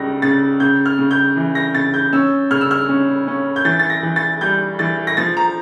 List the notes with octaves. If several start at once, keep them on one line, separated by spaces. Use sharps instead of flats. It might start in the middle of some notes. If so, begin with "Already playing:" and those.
Already playing: C#2 C#3 G3 A#6
C#3 A6
C#3 G6
F6
C#3
G6
E3
A#6
C#3 A6
G6
C#4 E6
C#3 F6
E6
F6
C#4
C#4
G6
E3 A6
A6
A#6
E3
A6
G3 G6
E3 A6
A#6
F3 A6
A#5